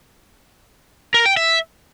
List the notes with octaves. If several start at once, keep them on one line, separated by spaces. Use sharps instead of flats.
A#4
G5
E5